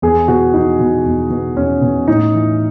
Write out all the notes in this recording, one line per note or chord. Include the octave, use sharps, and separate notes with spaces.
E2 G#4
B2 F#4
E2 D#4
B2
E2
B2
E2 C#4
B2
A2 D#4
E3